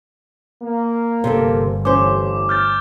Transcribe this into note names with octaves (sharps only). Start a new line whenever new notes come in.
A#3
G1 C3 C4 A4
A1 C#4 C5 D6
F6 G6 A6